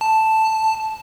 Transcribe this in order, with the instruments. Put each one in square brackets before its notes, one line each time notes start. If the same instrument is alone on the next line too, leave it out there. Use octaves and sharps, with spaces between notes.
[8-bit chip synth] A5